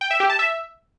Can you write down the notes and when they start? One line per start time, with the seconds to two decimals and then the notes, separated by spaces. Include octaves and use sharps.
0.01 G5
0.11 E5
0.20 G4
0.30 A5
0.39 E5